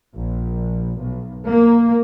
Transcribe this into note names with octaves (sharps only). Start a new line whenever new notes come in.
A#1
B1
A#3